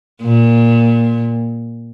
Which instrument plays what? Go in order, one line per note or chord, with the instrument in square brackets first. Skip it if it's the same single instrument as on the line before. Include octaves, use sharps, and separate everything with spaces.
[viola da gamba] A#2